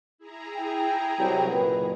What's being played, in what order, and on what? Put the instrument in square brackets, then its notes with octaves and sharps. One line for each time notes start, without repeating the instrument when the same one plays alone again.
[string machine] E4 G#4 A#5
[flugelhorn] G5
[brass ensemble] C2 F#3
F#1 A#2 B4